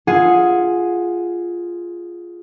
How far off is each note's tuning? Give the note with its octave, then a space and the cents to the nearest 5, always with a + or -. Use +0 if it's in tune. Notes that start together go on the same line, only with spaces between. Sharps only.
F4 -5 G#4 +0 F#5 -25